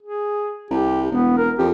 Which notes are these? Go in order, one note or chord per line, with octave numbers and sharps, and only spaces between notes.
G#4
C2 G4
E1 B3
A#4
F2 G4